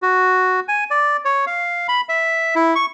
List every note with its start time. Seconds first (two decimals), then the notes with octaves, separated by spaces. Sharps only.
0.02 F#4
0.68 G#5
0.91 D5
1.25 C#5
1.47 F5
1.88 B5
2.09 E5
2.55 E4
2.75 C#6